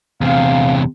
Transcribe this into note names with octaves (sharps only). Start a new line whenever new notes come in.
E2 C3 F5